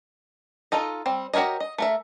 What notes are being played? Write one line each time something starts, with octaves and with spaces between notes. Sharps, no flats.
D#4 F4 A4 D#5
G3 C4
F#4 G4 A#4 C#5 D#5
D#5
A3 A#4 E5